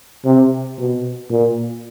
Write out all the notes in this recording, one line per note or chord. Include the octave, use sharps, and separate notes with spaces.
C3
B2
A#2